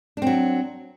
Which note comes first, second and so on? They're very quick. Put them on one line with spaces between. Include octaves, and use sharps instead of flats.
D4 C4 F#3